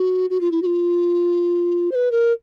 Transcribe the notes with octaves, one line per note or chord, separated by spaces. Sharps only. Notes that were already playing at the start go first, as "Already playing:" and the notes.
Already playing: F#4
F#4
F4
E4
F#4
F4
C5
B4
A#4